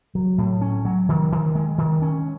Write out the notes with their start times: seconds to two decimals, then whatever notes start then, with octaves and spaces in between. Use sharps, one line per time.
0.15 F#3
0.38 A2
0.61 C#4
0.85 F#3
1.09 D#3
1.32 D#3
1.55 G#3
1.78 D#3
2.02 C#4